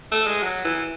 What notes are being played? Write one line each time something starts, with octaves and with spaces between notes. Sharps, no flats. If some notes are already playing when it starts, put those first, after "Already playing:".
A3
G#3
F#3
E3